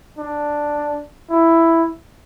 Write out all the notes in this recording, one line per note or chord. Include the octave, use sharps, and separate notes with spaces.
D4
E4